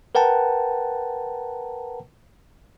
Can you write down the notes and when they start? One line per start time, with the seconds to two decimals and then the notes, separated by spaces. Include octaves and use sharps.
0.15 A#4 B4 F#5 G5 A5 A#5